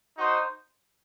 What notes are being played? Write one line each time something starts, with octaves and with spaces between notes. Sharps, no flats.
D#4 F#4 C5